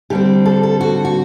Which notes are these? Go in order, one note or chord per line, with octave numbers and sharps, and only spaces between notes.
D3 G3 C4 G4
A4
A4
F#4
F#4